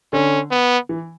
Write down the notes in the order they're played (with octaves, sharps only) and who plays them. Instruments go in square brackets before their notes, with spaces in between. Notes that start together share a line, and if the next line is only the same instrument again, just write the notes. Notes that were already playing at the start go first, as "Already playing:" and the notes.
[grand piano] D3 [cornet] C#4
[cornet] B3
[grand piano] E3